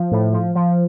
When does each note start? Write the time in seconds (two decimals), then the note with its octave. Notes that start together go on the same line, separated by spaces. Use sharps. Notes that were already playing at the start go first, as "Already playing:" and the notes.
Already playing: F3
0.12 A2
0.33 F3
0.55 F3